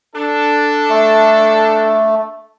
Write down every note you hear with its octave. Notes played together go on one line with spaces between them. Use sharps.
D4 A4
A3